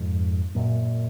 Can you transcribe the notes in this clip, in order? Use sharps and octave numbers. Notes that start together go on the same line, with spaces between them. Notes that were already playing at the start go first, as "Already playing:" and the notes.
Already playing: F2 G#2
F#2 A#2